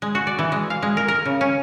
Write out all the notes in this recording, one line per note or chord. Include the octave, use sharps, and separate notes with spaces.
G#3
F#4
D5
E3
G#3
F5
G#3
A#4
A#4
C#3
C#4